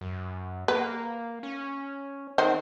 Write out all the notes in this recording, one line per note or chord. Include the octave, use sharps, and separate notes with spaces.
F#2
A#3 B4
C#4
D#3 C4 C5